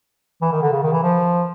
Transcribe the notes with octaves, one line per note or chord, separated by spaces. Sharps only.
E3
D#3
D3
C#3
D#3
E3
F3